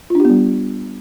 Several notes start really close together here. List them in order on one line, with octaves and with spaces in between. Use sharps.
F4 D4 G4 B3 G3